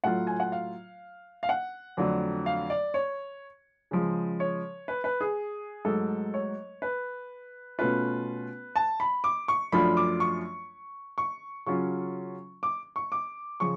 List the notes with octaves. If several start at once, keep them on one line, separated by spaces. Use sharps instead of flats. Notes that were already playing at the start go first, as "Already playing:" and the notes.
A2 F#3 A3 F4 F#5
G#5
F#5
F5
F5
F#5
F2 D3 F#3 A3
F5
D5
C#5
C#3 F3 G#3
C#5
B4
B4
G#4
G#2 F#3 A3 A4
C#5
B4
B2 A3 C#4 F4 B4
A5
B5
D6
C#6
F#2 F3 A3 D4 F4 B5
D6
C#6
C#6
C#3 F#3 C#4 F4 C#6
D6
C#6
D6
C#3 F3 C#6